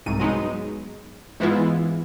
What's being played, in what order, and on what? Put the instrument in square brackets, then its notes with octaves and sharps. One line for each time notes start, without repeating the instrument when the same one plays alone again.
[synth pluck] C2 G#2 D#7
F#3 G#3 B3 D#4
G#2 E3 G#3 B3 E4 F4